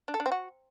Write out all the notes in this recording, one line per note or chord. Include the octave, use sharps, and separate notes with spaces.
D4
A4
D4
C4
F#4